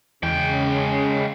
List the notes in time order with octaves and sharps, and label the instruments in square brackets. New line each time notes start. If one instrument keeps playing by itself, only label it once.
[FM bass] E2 [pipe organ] C#3 [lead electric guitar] G#3 G5